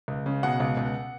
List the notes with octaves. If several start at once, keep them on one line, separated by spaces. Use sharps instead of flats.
C#2
C#3
B2 F#5
C#2
C#2